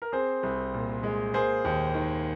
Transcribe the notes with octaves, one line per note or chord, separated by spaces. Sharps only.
A#4
C4 G#4 C5
C2
A#2
G#3
A#3 G#4 C5
D#2
D#3